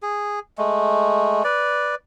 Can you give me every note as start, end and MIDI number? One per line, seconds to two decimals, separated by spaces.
0.02 0.39 68
0.58 1.43 56
0.58 1.43 57
1.44 1.95 71
1.44 1.95 74